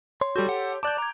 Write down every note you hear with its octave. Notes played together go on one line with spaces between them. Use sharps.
C#5 C6
G3 F#4 G4 A4 G6
F#5
D5 A5 D6 F#6 G6
A#5 G#6